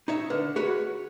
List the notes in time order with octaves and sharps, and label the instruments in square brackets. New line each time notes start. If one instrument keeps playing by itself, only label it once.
[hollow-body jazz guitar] D#4 C#5 E5
[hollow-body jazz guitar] D3 [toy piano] B4
[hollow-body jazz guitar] F#4 B4 C#5 [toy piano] G#4